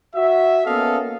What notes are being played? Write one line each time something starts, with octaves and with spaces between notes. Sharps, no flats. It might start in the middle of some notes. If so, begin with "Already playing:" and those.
F#4 E5
A#3 B3 C#4 A4 D#5 F5